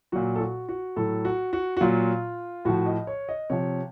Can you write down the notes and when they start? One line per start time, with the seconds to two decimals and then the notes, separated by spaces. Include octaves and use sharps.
0.12 A#2 F#3 F#4
0.35 A4
0.40 F#4
0.69 F#4
0.96 A2 F#3 A4
1.25 F#4
1.53 F#4
1.77 F#4
1.81 A#2 F#3 F4
2.65 A2 F3 F#4
2.86 D#5
3.07 C#5
3.29 D#5
3.50 C3 F3 C#5